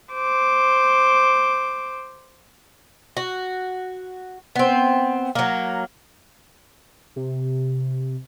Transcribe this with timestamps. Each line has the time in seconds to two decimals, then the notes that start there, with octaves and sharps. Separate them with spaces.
0.13 C5 D6
3.17 F#4
4.55 B3 C4
5.35 F#3 A#3
7.16 C3